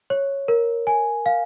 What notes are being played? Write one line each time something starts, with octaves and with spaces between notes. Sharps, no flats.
C#5
A#4
G#5
F5